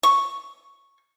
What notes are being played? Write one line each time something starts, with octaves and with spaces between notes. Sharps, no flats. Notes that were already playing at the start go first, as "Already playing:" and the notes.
C#6